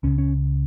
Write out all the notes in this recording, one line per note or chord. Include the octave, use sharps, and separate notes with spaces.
C#2 C#3 C#4
C#4